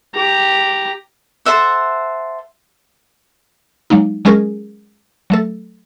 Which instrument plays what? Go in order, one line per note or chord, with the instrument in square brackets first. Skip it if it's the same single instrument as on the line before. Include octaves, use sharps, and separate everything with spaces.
[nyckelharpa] G4 A#5
[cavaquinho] A4 C5 E5 F#5
[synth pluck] F#3 G#3 A#3 D#4
F#3 G#3 C#4 G#4 A#4
F#3 A3 A4